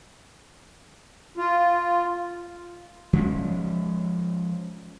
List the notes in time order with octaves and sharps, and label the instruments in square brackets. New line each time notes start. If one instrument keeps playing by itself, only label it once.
[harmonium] F4
[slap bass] F3 G#3 C#4